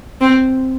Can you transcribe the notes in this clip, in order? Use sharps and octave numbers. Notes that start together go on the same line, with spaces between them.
C4